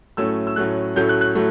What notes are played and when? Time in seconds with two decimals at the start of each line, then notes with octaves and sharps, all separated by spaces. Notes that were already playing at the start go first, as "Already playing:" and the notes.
0.17 A2 F#3 A3 C#4 E6
0.47 E6
0.56 A2 F#3 A3 C#4 F#6
0.96 A2 F#3 A3 C#4 G6
1.09 F#6
1.21 F#6
1.35 A2 F#3 A3